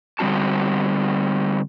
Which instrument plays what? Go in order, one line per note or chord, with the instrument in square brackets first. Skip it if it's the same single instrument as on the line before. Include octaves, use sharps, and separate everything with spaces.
[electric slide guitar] D3 G3 C4 F#4 A5